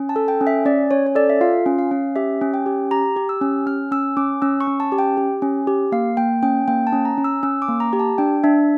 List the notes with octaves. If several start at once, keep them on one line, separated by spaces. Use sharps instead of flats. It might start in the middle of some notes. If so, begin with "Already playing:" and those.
Already playing: C#4
A5
A4
G5
C#4
E5
C#4 D5
C#4 C#5
C#5
A4 D5
E5
F4 F5
C#4
F5
C#4
G4 E5
C#4
G5
G4
G4 A#5
G4
E6
C#4
C#4 F6
C#4 E6
C#4 D6
C#4 E6
C#6
C#4
A5
G4
G5
G4
C#4
G4
A#3 F5
A#3 G5
C#4 G5
A#3 G5
A5
C#4
A#5
C#4
E6
C#4 E6
D6
A#3
A#5
G4
A5
D4 G5
D4 E5